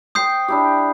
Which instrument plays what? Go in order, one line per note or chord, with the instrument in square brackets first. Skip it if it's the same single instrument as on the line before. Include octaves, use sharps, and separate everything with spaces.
[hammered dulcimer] C5 G5 [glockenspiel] D#6 G6 C7
[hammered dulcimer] D4 E4 G4